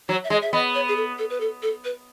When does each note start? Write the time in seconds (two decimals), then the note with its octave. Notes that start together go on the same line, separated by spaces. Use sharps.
0.08 F#3 C#5
0.24 E5
0.30 G#3 D#5
0.42 E5
0.53 B3 D#5
0.74 C#5
0.88 G#4
0.96 A4
1.18 A4
1.30 B4
1.40 A4
1.62 A4
1.84 B4